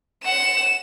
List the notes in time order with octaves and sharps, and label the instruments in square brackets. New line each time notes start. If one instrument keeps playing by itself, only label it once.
[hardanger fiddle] F#5 [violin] E7